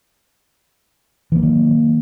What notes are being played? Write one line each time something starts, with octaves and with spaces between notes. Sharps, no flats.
D#3 E3 F#3 A#3